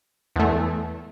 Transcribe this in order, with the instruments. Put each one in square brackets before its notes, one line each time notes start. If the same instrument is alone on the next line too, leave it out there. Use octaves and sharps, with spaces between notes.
[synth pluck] E2 A3